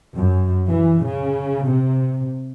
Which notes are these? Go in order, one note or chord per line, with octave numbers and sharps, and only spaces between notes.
F#2
E3
C#3
C3